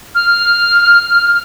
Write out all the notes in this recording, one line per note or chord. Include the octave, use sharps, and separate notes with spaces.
F6